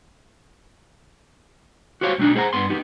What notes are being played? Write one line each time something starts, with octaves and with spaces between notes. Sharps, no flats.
F#4 G4 C5 C#5 F5
B1 A3 C4 D4 D#4
G#4 C5 F#5 A#5
G2 B3 C6
B3 D#4 G4